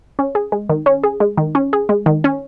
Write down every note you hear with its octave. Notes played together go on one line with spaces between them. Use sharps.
C#4
G#4
G#3
D#3
C#4
G#4
G#3
D#3
C#4
G#4
G#3
D#3
C#4